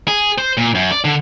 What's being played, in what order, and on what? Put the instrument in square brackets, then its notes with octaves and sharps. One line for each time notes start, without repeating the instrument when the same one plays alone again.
[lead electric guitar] G#4
C5
A#2
F#2
D5
D3